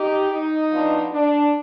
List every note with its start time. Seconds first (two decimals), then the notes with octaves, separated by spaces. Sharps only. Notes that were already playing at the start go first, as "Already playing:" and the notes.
Already playing: D#4 G4
0.31 D#4
0.72 F3 B3 D4
1.12 D4